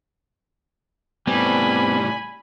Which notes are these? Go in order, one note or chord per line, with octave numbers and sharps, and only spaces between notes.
A2 G3 B3 C4 G#5 B5